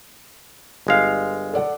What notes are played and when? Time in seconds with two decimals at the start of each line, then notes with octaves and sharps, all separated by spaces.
0.87 G1 G#3 F5
1.54 A4 D5 F#5